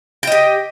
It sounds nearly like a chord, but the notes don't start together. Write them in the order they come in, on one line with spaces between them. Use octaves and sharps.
G5 D#5 G4